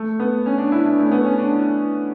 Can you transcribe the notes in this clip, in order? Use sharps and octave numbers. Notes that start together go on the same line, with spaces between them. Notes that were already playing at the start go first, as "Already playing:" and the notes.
Already playing: A3
B3
C#4
D4
E4
D4
A3
C#4
B3
C#4
D4
E4